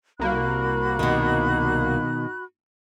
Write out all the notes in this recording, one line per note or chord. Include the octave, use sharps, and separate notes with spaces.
C2 A#3 F#4 B5 F#6
B2 D#3